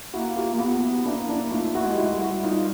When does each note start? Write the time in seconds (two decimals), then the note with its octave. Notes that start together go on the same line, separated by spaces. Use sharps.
0.14 A#3 E4 F#4
0.36 F4 G4
0.54 A#3
0.60 B3 F4 G4
0.71 G4
0.83 E4 F#4
1.06 A#3 D4 E4
1.29 D4 E4
1.52 A3 D#4 F4
1.75 E4 F#4
1.83 G#3
1.91 G4
1.98 E4 F#4
2.13 G3
2.20 E4 F#4
2.43 D#4 F4